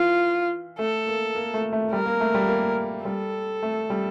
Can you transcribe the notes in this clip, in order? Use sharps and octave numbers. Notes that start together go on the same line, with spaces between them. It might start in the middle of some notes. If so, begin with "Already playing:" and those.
Already playing: E3 F4
A3 A4
A#3
A#3
A3
A3
G3 A#4
A#3
A3
G3
A#3
G3 A4
A3
G3